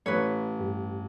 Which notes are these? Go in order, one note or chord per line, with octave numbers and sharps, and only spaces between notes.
A1 B4 C#5
G2 G4